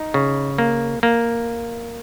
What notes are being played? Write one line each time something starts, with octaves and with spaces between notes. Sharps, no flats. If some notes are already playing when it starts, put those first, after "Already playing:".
Already playing: D#4
C#3
A#3
A#3